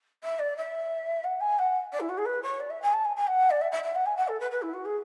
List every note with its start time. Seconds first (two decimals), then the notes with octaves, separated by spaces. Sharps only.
0.23 E5
0.39 D5
0.57 E5
1.24 F#5
1.40 G#5
1.58 F#5
1.92 D5
2.00 E4
2.09 F#4
2.17 G#4
2.25 B4
2.43 C#5
2.60 D5
2.70 E5
2.82 G#5
2.93 A5
3.05 G#5
3.16 G#5
3.27 F#5
3.50 D5
3.61 E5
3.71 E5
3.83 E5
3.95 F#5
4.05 G#5
4.17 F#5
4.28 A4
4.40 B4
4.51 B4
4.62 E4
4.73 F#4
4.85 G#4